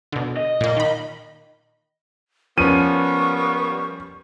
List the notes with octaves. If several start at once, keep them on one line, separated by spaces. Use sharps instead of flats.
B2 D3
D#5
A#2 A#3
D#3 B5
F3 G3 A#3 B3 C#4 C#6 D#7